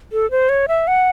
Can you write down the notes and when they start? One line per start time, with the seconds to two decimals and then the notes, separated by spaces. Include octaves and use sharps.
0.12 A4
0.31 C5
0.49 C#5
0.68 E5
0.87 F#5